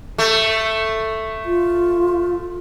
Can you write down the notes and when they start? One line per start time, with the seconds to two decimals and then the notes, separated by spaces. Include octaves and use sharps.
0.18 A3
1.45 F4